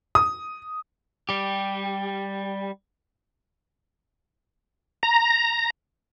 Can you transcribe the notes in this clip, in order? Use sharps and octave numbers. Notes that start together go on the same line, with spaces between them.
D#6
G3 G4
A#5